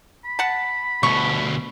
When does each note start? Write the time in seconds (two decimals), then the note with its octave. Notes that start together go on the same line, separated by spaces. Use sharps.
0.25 B5
0.39 F#5 A5
1.03 D2 B2 C#6